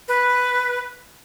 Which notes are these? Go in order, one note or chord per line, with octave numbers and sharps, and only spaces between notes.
B4